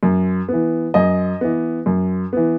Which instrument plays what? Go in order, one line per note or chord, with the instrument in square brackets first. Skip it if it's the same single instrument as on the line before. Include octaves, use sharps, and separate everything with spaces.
[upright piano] F#2
E3 B3
F#2 D#5
E3 B3
F#2
E3 B3